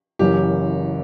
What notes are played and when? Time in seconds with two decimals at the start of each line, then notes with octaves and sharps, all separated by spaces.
0.19 F#1 F#2 E3 G4